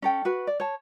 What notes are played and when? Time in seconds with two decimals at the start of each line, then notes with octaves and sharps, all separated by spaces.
0.02 C#4 A4 G5
0.25 F#4 B4
0.47 D5
0.60 C#5 A5